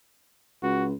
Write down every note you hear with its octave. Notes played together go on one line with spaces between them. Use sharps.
C#2 F#4